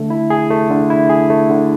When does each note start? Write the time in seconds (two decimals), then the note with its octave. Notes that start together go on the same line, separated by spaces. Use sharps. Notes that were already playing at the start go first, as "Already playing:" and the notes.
Already playing: D3 A3
0.10 E4
0.30 G#4
0.50 A3
0.70 D3
0.90 E4
1.10 G#4
1.30 A3
1.50 D3